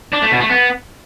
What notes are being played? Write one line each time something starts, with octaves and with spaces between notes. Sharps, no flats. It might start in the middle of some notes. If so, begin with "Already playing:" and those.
D4
A3
B2
A3
B3